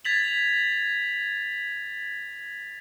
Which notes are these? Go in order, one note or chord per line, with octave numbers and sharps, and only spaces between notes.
G#6 A6 B6 F7 F#7